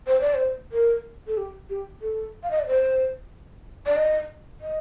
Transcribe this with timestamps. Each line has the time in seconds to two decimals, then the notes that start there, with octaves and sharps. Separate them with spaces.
0.07 C5
0.21 D5
0.34 C5
0.72 A#4
1.27 A4
1.37 G4
1.70 G4
2.02 A4
2.43 F5
2.51 D#5
2.59 D5
2.67 C5
3.86 D5
3.96 D#5
4.61 D#5